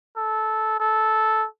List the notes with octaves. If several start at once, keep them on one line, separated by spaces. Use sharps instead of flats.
A4
A4